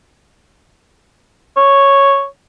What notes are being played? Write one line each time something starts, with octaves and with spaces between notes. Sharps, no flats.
C#5